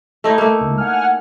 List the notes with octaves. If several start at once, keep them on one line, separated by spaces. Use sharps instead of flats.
A3 D#4 E4
A3 A#3
C#2
F#5 G#5 F6